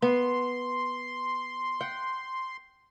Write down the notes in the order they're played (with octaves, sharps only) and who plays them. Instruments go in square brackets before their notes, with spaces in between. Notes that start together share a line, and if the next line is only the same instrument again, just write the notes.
[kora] B3 [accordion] C6
[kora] F#5 G5